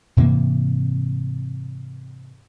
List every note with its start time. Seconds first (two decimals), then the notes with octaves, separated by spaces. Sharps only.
0.17 G#2 C3 E3 A#3